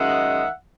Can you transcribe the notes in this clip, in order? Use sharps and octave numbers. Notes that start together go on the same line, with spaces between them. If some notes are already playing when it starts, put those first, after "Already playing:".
Already playing: F#2 D#3 G#3 E5 F#5